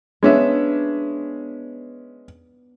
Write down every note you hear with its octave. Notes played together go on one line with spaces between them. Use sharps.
G#3 B3 C#4 D4 B4 E5